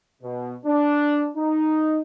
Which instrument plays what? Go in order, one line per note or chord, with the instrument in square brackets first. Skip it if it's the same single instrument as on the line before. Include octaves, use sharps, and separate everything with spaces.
[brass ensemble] B2
D4
D#4